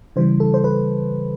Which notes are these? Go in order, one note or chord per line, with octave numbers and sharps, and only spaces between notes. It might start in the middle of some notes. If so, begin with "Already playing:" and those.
C#3 E3 G3 C5
A4
C5
B4